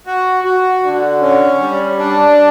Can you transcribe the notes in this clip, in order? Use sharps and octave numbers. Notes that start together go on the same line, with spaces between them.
F#4
F#4
D3
C#4
G3
D4